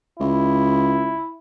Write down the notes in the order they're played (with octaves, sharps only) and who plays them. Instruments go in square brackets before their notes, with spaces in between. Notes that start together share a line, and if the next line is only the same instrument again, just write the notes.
[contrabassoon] C#2 [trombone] E4